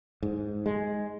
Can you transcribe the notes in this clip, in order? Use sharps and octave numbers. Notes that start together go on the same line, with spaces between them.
G#2
G#3